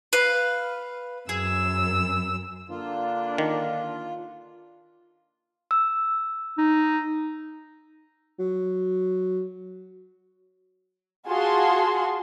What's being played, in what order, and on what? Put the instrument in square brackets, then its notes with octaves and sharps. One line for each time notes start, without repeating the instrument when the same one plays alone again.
[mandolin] B4 F5
[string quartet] F#2 E6 [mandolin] G#4
[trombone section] D3 A#3 D4 [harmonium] F4
[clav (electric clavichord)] D#3
[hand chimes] E6
[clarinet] D#4
[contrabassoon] F#3
[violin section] F4 F#4 G#4 A5 C6